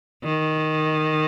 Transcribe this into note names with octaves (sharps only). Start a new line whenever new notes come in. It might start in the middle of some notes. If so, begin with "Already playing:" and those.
D#3